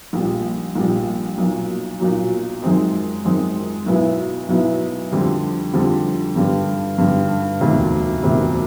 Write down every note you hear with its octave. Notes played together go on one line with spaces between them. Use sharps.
A#1 A#2 G3
A#1 A#2 G3
B1 A#2 F#3
B1 A#2 F#3
F#2 D#3 G#3 C4 D#4
F#2 D#3 G#3 C4 D#4
B1 B2 F#3 B3 E4
B1 B2 F#3 B3 E4
F2 D3 G3 C4
F2 D3 G3 C4
G2 D3 G3
G2 D3 G3
E1 D2 C3 D#3
E1 D2 C3 D#3